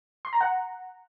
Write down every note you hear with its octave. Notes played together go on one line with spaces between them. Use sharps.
C6
A#5
F#5